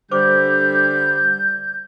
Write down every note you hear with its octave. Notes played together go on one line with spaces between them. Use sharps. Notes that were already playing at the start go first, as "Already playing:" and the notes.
D3 G3 C5 D6 G6